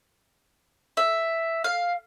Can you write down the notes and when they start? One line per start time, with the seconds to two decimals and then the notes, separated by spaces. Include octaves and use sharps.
0.97 E5
1.64 F5